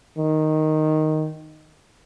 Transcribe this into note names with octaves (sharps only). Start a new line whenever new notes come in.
D#3